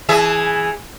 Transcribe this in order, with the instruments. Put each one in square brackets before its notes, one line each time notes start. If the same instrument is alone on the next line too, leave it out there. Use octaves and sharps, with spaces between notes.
[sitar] E3 G#4 E5